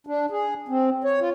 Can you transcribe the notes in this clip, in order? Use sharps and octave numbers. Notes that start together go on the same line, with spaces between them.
D4
G#4
C4
C#5
F4